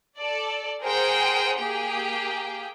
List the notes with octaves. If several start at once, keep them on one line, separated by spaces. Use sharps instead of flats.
A4 D5
G#4 A#4 C5 F#5 G5
A#3 G4 G#4 G5